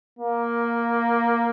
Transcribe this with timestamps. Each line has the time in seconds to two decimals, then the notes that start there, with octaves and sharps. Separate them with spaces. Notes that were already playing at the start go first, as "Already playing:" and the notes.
0.19 A#3